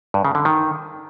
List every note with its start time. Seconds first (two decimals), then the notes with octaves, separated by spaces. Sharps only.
0.14 G2
0.25 C#3
0.35 D3
0.45 D#3